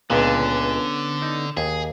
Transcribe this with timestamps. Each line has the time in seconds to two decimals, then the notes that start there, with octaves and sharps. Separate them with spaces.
0.10 C#2 A#2 D3 B3 C#4 D4
1.22 D#4
1.57 D#2 G#4